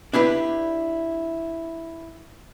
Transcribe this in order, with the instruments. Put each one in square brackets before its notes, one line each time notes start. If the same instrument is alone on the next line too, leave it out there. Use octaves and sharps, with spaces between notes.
[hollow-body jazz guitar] D4 E4 G4 B4